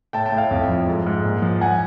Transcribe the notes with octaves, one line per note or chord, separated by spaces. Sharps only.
A2 G5 A5
G5 A5
A2
F5 G5
F2
F3
G#2
G#2
A#2
F3
F3 F#5 G#5